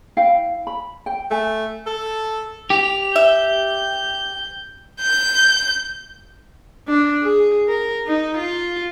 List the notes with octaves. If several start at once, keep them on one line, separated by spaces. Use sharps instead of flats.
E4 F5 G5
B5
G5
A3 E5 G#5
A4
G4 F7
E5 G6
G6
D4
G#4
A#4
D#4
F4